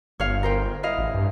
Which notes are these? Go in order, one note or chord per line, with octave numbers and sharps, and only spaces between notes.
G1 C#5 F5
A#4 C5 G5
E4 D#5 F5
A1
G2